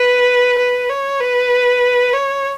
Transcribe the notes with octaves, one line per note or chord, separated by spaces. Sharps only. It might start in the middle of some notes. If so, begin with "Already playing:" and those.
Already playing: B4
B4
C#5
B4
C#5